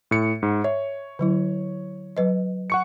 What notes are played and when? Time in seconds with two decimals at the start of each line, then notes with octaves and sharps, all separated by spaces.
0.11 A2 C#7
0.43 G#2
0.64 C#5 E5
1.19 D3 F#3 E4
2.17 F#3 B4 D#5
2.70 F#5 C#6 C#7